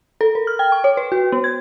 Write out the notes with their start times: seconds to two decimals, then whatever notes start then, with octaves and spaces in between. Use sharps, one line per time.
0.21 A4
0.35 A#4
0.47 F6
0.59 G5
0.72 C#6
0.84 C#5
0.97 B4
1.12 F#4
1.32 B3
1.44 G#6